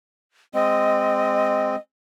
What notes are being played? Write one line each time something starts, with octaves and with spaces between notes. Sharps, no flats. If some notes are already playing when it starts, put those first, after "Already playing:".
G#3 C4 D#5